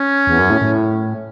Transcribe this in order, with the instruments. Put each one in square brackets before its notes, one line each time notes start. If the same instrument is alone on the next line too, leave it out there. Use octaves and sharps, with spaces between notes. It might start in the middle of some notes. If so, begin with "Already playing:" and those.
Already playing: [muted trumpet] C#4
[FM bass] E2
F#2
A2
A2